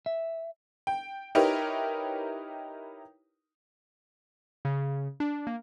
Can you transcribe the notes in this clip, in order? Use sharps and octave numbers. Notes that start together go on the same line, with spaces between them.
E5
G5
D#4 E4 G4 A#4 B4 C#5
C#3
D4
A#3